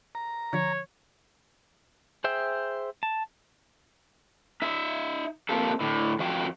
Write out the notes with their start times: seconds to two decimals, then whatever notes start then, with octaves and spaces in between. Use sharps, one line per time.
0.15 A#5
0.53 D3 F3 C#5
2.24 G#4 C5 E5 G5
3.03 A5
4.62 D#4 E5
5.49 A3 A#3 C4 F4 G4 A4
5.80 A2 D3
6.19 F2 F3 F#4 G5